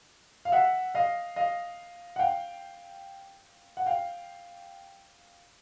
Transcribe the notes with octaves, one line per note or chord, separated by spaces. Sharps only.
F5
E5 F#5
D#5 F5
D#5 F5
F#5
F5 G5
F#5
F5 G5